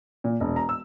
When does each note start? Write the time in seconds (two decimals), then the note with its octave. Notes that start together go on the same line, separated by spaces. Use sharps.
0.24 A#2
0.40 E1
0.56 A#5
0.69 E6